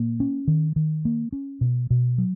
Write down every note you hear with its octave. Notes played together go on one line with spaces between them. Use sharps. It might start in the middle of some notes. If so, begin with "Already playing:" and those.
Already playing: A#2 A#3
C#4
D#3
D#3
A#3
C#4
B2
B2
F#3